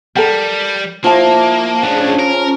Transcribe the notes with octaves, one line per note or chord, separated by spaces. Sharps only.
G3 A4 A#4 G5
F3 A#3 E4 A5
A2 C#4 D4 G#4 A5
C#4 A#4